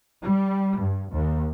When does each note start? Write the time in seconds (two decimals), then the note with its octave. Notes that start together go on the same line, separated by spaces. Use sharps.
0.23 G3
0.81 G2
1.12 D#2